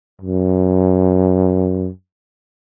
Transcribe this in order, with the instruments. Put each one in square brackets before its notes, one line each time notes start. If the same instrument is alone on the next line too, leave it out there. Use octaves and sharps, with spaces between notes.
[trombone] F#2